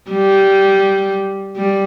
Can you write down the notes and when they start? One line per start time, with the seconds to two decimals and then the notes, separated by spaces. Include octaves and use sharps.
0.10 G3
1.56 G3